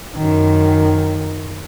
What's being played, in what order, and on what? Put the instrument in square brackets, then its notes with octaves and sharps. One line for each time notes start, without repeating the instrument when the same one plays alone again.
[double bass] F#2 D#3